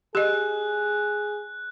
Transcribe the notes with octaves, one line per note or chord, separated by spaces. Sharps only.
G4 G#4 D#5 F#6